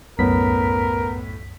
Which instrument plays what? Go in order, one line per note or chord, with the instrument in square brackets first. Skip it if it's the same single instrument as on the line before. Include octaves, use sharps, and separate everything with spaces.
[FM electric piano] C2 F#2 B6 [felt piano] A2 A3 C#4 [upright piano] B3 [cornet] A#4